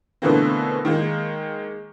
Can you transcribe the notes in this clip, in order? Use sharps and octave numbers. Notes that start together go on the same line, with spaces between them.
B2 D3 E3 A3 A#3 C4
D#3 G#3 A#3